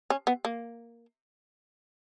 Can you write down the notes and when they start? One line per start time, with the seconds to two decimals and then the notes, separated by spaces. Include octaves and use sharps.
0.10 C#4
0.27 B3
0.45 A#3